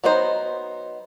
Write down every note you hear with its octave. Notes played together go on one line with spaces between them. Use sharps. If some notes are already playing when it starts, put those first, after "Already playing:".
F#3 B3 D#4 C5